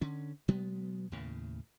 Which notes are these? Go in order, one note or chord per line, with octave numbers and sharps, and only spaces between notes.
D3 C#4
B2 F#3 G#3 B3
D#2 A2 C#3